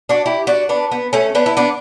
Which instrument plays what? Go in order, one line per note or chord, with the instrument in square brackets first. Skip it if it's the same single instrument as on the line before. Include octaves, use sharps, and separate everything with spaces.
[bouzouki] D4 F#4
E4 G4
D4 F#4
B3 D4
B3
A3 C#4
B3 D4
E4
B3 D4